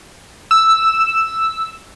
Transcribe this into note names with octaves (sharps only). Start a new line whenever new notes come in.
E6